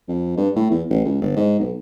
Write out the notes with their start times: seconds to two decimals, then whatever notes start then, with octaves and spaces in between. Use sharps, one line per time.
0.08 F2
0.37 G2
0.56 A2
0.71 E2
0.90 A1
1.05 C#2
1.21 G1
1.37 G#2
1.59 B1